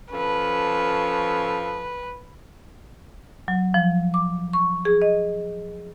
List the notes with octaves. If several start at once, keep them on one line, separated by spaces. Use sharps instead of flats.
F3 C#4 A4 B4
F#3
F3
D6
C#6
G#4
D#5